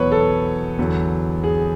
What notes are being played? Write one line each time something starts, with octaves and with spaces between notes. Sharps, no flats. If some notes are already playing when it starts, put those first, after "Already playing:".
Already playing: E2 B2 F#3 B4 C#5
A4
E2 D3 F#3
G#4